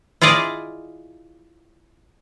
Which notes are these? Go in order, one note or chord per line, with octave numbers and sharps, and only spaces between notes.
E4 F4 G#4 D5 D#5